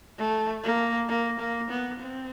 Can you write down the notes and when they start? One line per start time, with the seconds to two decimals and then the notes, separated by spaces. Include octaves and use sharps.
0.18 A3
0.63 A#3
1.09 A#3
1.39 A#3
1.70 B3
1.99 C4